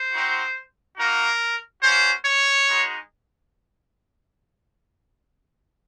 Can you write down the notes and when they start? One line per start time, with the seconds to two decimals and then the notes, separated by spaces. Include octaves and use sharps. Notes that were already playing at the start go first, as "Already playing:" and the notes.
Already playing: C5
0.12 C4 D#4 F#4
0.97 A#3 D#4 F#4 A#4
1.82 A#3 C#4 F#4 C5
2.24 C#5
2.67 G#3 D#4 F#4